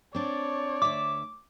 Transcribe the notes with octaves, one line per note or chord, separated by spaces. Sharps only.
C4 D4 C#5 D5
D2 E5 D6